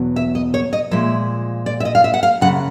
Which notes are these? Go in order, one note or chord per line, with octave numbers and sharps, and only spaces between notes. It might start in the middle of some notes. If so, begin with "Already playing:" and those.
Already playing: E2 B2 F#3
E5
D#5
C#5
D#5
A#2 F3 G#3 E5
D5
E5
D#5
F5
E5
F#5
F5
F#2 C#3 F#5